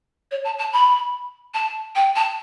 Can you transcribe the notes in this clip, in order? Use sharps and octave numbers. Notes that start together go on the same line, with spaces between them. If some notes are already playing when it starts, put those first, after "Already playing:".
C#5
A5
A5
B5
A5
G5
A5